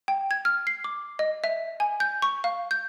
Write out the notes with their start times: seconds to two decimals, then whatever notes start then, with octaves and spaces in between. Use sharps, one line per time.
0.08 G5
0.31 G#6
0.45 F6
0.67 C7
0.84 D6
1.19 D#5
1.44 E5
1.80 G#5
2.00 G6
2.22 C#6
2.44 F5
2.71 G6